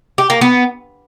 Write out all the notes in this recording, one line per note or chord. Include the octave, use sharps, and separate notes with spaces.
G4
A#3
B3